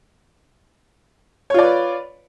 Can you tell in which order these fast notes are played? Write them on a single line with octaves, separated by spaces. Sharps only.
C#5 F4 D5 B4